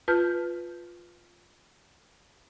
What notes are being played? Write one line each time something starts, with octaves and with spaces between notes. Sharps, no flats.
F4 B4 A5 F6 G6